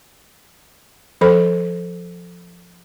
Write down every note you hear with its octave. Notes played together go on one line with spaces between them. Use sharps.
F3 A4 C5 B5